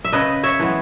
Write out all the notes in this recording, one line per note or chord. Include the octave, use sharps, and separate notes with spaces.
E5
C#3 B4 D#5
C#5 E5
E3 G#3 B3